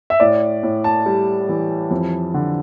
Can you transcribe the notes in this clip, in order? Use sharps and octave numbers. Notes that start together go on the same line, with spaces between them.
E5
A2 D5
A2
A5
G3
E3
F2
D3